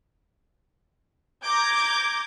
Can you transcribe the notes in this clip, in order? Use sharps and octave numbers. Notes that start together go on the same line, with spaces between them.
A#5 D6 G6 G#6